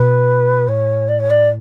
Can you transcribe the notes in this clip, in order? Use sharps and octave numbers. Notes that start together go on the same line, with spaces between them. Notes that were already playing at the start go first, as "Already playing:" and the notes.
Already playing: B2 B4
A2 C#5
D5
C#5
D5